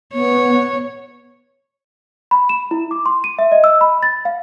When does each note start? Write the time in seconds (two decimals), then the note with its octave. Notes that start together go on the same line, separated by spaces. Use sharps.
0.14 B3 C#5
2.31 B5
2.49 E7
2.71 E4
2.91 D6
3.06 C6
3.24 D#7
3.39 E5
3.52 D#5
3.64 E6
3.81 B5
4.03 A6
4.25 F5